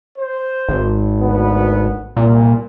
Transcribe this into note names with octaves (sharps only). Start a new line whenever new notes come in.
C5
G#1
D2 B3
C2 A#2